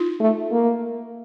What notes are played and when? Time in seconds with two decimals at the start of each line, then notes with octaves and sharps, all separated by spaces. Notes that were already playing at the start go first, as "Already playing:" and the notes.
Already playing: D#4 F4
0.20 A3
0.52 A#3